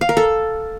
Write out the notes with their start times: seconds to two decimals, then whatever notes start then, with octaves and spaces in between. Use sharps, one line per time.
0.01 F5
0.09 A#4
0.17 A4